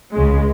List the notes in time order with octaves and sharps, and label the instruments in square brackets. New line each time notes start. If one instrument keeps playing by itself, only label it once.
[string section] C#2 C#3 G#3